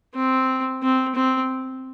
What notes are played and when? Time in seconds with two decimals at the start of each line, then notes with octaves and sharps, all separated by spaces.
0.15 C4
0.83 C4
1.16 C4